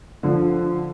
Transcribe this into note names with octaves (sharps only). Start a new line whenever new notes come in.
D3 F3